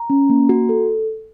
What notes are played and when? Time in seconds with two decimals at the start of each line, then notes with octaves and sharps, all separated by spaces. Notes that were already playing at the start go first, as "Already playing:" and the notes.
Already playing: A#5
0.10 C#4
0.30 A#3
0.49 F#4
0.69 A4